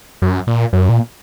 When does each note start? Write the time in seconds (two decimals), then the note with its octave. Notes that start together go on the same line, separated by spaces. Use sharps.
0.22 F#2
0.47 A#2
0.73 F#2
0.89 A#2